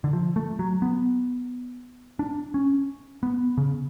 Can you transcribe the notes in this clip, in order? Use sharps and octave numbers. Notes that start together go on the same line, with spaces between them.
D3
F3
A3
F#3
B3
D4
C#4
B3
C#3